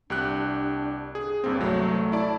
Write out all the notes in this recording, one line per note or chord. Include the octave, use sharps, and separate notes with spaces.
C2 D4 G4 F#6
G#4
G1 G2 A#3 C4
C2 F#3 A3
E4 D5 A5